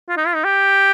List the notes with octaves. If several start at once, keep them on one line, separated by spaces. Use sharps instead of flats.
F4
D#4
F4
D#4
G4